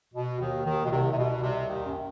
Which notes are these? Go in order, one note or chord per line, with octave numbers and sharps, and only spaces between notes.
B2
D#2 D#3
D#2 D#3
B2
C2 C3
C3
B2
C2 C3
D#2 D#3
F#2